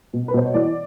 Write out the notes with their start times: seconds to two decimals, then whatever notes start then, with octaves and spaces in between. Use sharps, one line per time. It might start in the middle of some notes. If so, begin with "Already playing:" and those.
0.13 B2
0.28 B4
0.34 B2 C5
0.45 C#5
0.54 E3 D5